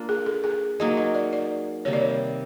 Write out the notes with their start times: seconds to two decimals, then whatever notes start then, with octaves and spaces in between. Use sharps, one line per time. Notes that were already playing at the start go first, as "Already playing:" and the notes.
Already playing: A#3 D4 F4
0.09 G#4
0.26 A4
0.44 G#4
0.80 F#3 A#3 D#4 G#4 D#5
0.97 D#5
1.15 D5
1.33 D5
1.85 C3 D#3 G3 A#3 C#5
1.93 D5
2.02 C#5